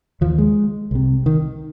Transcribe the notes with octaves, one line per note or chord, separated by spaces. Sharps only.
D#2 F3
G#3
C2 C3
D#3